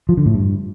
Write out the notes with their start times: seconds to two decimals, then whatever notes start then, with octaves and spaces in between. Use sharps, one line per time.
0.09 F3
0.17 D3
0.26 A2
0.34 G2